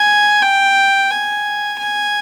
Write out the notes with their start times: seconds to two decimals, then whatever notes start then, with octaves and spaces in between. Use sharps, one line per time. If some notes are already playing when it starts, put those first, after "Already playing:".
Already playing: G#5
0.42 G5
1.10 G#5
1.78 G#5